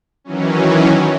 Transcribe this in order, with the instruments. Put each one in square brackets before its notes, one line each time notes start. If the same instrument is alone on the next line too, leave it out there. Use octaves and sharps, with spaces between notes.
[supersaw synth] D#3 E3 F#3 C#4